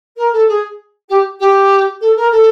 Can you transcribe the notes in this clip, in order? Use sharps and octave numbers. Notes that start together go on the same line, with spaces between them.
A#4
A4
G#4
G4
G4
A4
A#4
A4